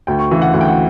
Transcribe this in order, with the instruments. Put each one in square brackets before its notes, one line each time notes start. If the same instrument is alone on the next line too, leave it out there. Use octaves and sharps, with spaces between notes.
[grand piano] D2 G5
C#6
C#3 E3
F#5
D2 F#5
G5
F#5